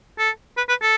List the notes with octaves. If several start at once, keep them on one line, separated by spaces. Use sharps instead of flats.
A4
B4
B4
A4